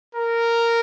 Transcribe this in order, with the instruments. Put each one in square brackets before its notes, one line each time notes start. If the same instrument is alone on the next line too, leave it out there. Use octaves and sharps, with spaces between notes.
[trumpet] A#4